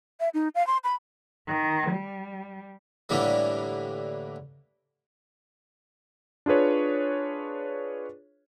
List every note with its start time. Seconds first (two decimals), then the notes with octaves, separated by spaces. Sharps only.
0.20 E5
0.34 D#4
0.55 F5
0.67 C6
0.84 B5
1.47 D#3
1.91 G3
3.09 A2 D3 E3 G3 A#3
6.46 D4 F4 G#4 B4 C#5